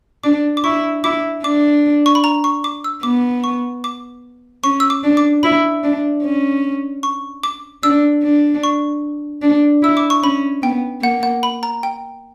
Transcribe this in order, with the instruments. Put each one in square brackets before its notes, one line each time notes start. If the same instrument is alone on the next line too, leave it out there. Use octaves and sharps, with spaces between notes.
[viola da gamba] D4 [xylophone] D6
[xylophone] D6
[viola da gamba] E4 [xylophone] C#6
[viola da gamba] E4 [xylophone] D6
[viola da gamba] D4 [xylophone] D6
[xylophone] C#6
B5
A#5
C#6
D6
E6
[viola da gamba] B3 [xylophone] D6
[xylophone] C#6
D6
[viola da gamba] C#4 [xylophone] C#6
[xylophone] E6
D6
[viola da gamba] D4
[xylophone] D6
[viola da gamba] E4 [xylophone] B5
[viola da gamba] D4
C#4
[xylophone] C#6
D6
[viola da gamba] D4 [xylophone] E6
[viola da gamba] D4
[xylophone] C#6
[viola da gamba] D4
[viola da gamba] E4 [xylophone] E6
[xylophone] D6
C#6
[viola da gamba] C#4 [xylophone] B5
[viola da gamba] B3 [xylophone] G5
[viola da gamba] A#3 [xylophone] F#5
[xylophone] F#5
B5
A#5
G5